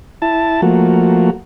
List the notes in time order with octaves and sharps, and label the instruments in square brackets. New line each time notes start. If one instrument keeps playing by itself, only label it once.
[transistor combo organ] E4 A5
F3 A3 A#3 F#4